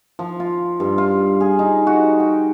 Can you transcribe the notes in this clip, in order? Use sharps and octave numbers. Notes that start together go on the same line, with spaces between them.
F3
F4
G2
F4
G#4
D#4
F#4
G5